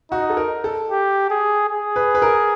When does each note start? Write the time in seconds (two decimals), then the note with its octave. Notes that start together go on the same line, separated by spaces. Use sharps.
0.11 D#4 F#4
0.30 A4
0.37 A#4
0.64 A4
0.91 G4
1.30 G#4
1.69 G#4
1.96 B4
2.15 B4
2.22 A#4